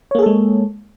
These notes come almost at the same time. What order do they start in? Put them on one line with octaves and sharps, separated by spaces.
C#5 A#3 G#4 A4 G#3